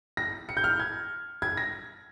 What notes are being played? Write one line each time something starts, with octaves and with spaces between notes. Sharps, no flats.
A#6
C#7
G6
F6
G#6
G#6
A#6